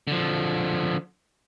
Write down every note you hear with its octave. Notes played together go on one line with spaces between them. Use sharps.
D3 F3